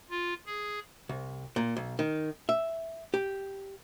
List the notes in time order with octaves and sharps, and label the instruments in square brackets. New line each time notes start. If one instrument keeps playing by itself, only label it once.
[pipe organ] F4
G#4
[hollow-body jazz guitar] C2
A#2
B1
D#3
E5
G4